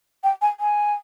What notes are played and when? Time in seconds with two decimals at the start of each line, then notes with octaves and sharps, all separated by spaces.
0.24 G5
0.42 G#5
0.60 G#5